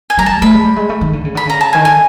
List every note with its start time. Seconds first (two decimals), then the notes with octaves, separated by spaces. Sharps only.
0.10 G#5
0.18 G3 A#5
0.26 A5
0.42 A3 B5
0.53 G#3
0.64 G3
0.76 G#3
0.89 A3
1.01 D#3
1.13 D3
1.25 C#3
1.35 D3 B5
1.46 C#3 A#5
1.61 A5
1.73 D#3 G#5
1.85 D3 G#5